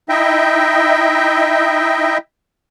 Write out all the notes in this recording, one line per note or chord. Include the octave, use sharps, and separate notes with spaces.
D#4 E4 D#5 E5 G5